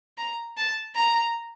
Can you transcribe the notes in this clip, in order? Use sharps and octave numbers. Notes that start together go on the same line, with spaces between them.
A#5
A5
A#5